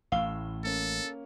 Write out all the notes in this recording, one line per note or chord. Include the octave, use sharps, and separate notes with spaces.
A1 A2 F5 E6 G7
A#3 C#4 A4